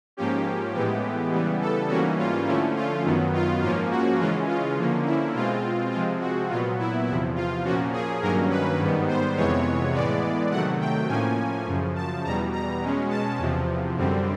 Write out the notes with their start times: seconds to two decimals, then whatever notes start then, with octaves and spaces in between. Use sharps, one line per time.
0.17 G#2 F3 A#3 C#4 G4
0.75 A2 E3 G#3 B3 G4
1.32 C#3 E3 G3 B3
1.61 A4
1.89 G#2 E3 G3 A#3 C#4 F#4
2.18 F4
2.47 D3 F3 A3 C#4 E4
2.76 F4
3.05 F#2 D#3 F#3 B3
3.34 F4
3.62 G#2 F3 A#3 C#4 F4
3.91 F#4
4.19 C#3 E3 G#3 C#4 F4
4.48 F4
4.77 D3 F3 A#3 C#4
5.05 E4
5.34 B2 G#3 C4 F4
5.92 C3 F3 G#3 C4 F4
6.20 F#4
6.49 A#2 F#3 B3 F4
6.79 E4
7.07 E2 C3 F3 E4
7.35 F4
7.64 A#2 F3 A#3 C#4 F#4
7.93 G#4
8.21 G2 D#3 F#3 A#3 C#4 A#4
8.50 B4
8.79 G#2 D#3 G3 B3
9.08 C5
9.37 F2 C3 E3 G#3 B3 C#5
9.94 A2 E3 G#3 B3 D5
10.51 C3 D#3 F#3 A3 F#5
10.80 G5
11.09 A2 F3 A#3 C#4 G#5
11.67 F#2 C#3 F3
11.95 A5
12.24 E2 B2 G3 A#5
12.52 A#5
12.81 B2 G#3 C#4
13.10 A5
13.38 E2 C3 F3
13.96 F#2 D3 G3 C4